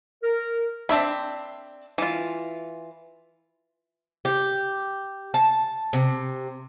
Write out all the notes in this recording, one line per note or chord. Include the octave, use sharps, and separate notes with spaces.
A#4
C4 D4 E5 B5
E3 F4
G4
A5
C3